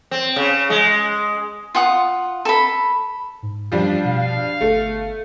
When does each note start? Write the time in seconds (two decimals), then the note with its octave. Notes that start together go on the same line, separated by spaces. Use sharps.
0.11 C4
0.36 C#3
0.70 G#3
1.75 F4 F#5 D#6
2.45 A4 B5
3.42 G#2
3.72 F#2 F3 G3 D4
4.05 B2 F5
4.61 G1 A3